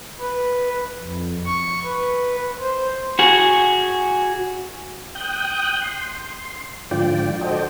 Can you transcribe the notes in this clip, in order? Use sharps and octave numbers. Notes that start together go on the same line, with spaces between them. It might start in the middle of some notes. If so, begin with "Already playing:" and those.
B4
F2
C#6
B4
C5
F#4 G#4
G5 D#6 F#6 G6
C6
G#2 D3 F3 F4 D5 G5
F#4 A4 C5 D5 D#5 G5